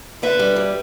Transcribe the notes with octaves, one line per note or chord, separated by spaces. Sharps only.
D3 B4 E5
G3
G2